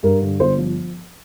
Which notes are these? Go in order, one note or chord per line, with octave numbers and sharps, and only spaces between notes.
G2 A#4
D3
G1 C5
F3